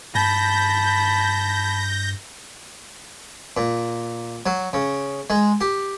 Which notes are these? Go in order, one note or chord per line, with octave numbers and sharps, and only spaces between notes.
G2 A5 B5 G6 A#6
A#2
F#3
C#3
G#3
G4